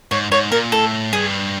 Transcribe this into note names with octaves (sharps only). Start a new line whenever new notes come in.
G#2 C#5
G#2 C#5
A#2 A#4
A2 A4
G2 G#4